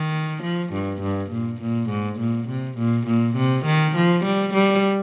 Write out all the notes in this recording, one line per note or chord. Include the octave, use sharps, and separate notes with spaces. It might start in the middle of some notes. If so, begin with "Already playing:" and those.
Already playing: D#3
F3
G2
G2
A#2
A#2
G#2
A#2
C3
A#2
A#2
C3
D#3
F3
G3
G3